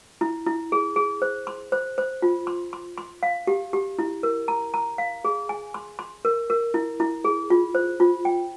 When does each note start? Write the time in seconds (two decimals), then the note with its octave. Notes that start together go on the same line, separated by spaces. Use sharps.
0.21 E4
0.46 E4
0.72 G#4
0.96 G#4
1.22 C5
1.47 C6
1.72 C5
1.98 C5
2.22 F4
2.47 C6
2.73 C6
2.98 C6
3.23 F5
3.47 G4
3.73 G4
3.99 E4
4.23 A#4
4.48 A#5
4.74 A#5
4.98 F5
5.25 G#4
5.49 G#5
5.74 C6
5.99 C6
6.25 A#4
6.50 A#4
6.74 E4
7.00 E4
7.25 G#4
7.50 F4
7.75 C5
8.00 F4
8.25 G5